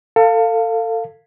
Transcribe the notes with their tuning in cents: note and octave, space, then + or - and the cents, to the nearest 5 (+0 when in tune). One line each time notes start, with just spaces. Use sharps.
A4 +30 F5 +0